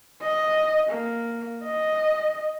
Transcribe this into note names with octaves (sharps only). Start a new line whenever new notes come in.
D#5
A#3
D#5